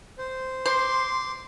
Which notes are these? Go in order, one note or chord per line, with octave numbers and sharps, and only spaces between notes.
C5
C5 C6 D6